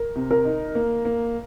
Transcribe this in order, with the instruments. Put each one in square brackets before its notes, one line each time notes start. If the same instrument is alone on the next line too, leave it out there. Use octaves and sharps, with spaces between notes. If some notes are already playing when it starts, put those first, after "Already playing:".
Already playing: [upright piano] A#4
[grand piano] C3
[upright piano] A#4
[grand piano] D#4
A#3
A#3